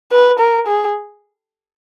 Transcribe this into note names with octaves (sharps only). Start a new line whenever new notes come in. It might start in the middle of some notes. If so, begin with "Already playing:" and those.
B4
A#4
G#4